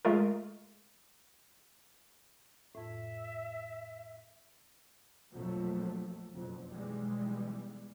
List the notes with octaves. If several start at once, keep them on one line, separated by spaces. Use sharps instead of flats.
G#3 A3 F4 A#4
F2 A2 E5
A#1 F2 B2 F3 F#3 A3
F#1 F2 B2
B1 B2 E3 G3 G#3